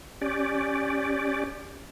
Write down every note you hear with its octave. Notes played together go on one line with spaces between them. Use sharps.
C#4 G4 D5